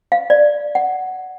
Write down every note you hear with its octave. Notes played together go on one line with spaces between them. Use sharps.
F5
D5
F#5